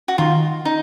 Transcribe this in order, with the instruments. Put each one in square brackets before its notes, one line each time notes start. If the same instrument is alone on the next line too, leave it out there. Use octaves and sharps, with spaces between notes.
[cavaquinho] F#4
[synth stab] D#3 [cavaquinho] F4
[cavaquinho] D#4